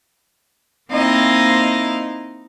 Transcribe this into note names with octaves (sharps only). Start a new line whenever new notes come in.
A#3 C4 D#4 E4 D#5 F5